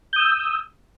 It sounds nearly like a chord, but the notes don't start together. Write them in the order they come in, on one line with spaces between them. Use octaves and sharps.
G6 D#6 E6